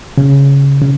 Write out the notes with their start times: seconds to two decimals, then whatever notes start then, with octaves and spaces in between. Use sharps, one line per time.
0.18 C#3
0.82 C#3